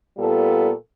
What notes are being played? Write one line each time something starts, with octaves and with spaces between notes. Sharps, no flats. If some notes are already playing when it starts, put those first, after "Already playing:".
A#2 G3 B3 F4 A4